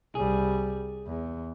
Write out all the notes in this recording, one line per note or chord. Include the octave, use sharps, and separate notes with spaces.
C2 G3 G#4
E2